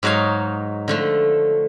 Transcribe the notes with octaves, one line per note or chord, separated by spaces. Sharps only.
G#2 F#3 D#4 C#5 F5
D3 F3 A3